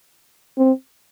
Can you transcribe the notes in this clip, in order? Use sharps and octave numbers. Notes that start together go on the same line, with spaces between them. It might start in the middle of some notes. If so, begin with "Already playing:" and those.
C4